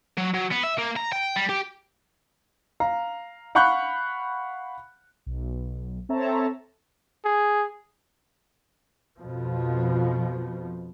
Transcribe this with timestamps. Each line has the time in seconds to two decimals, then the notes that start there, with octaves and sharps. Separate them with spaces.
0.17 F#3
0.34 F#3
0.51 B3
0.63 E5
0.78 A#3
0.96 A#5
1.12 G5
1.36 G3
1.49 G4
2.80 F5 A#5
3.55 F5 F#5 B5 C#6 F#6 G6
5.26 B1
6.09 C4 A4 C#5 E5 A5 A#5
7.25 G#4
9.19 F2 B2 F3